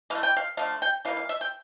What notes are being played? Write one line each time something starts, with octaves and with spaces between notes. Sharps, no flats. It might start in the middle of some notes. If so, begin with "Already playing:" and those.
E3 A3 F5
G5
F5
D3 F3 A3 F5
G5
E3 G3 A#3 F5
F5
E5
G5